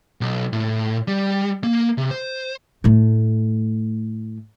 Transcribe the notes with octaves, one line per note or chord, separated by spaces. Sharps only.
B1
A2
G3
A#3
C3
C5
A2 A3